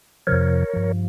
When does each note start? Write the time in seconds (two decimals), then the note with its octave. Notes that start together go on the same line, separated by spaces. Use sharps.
0.27 F2 C3 F3 A#4 C#5
0.74 G2 F3